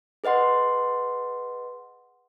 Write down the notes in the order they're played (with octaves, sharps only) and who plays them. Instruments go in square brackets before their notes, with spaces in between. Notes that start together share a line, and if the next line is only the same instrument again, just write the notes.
[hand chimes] G#4 B4 D#5 F#5 C6